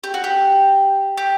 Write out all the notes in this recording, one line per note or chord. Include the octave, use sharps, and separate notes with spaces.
G4
F#4
G4
G4